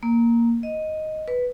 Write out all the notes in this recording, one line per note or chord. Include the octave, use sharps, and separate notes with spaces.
A#3
D#5
B4